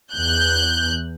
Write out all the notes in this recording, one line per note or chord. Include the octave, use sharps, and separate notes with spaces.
E2 F#6 G6